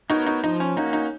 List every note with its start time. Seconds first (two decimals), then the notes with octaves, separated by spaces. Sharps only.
0.10 B3 D#4 F#4 A#4 C#5
0.26 D#4
0.44 F3 D#4
0.60 C#4
0.77 A#3 C#4 D#4 F#4
0.93 D#4